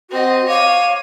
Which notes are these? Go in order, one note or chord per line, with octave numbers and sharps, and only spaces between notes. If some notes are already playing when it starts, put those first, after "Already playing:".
C4 F#4 D#5
C#5 F5 D6 D#7